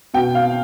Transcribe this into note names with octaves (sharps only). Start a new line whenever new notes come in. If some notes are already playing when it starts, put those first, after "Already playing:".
B2 G5
F5